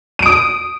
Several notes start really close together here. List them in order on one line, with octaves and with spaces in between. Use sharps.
D#7 D7 D#6